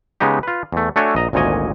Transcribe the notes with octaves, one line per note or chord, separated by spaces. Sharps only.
C#3 G#3 B3 D#4 G4
F4 B4
E2 A3
A3 D4 F#4 A4 C#5 G#5
A#1 D#5 A#5
G#1 D2 A#2 C#5 D#5 G#5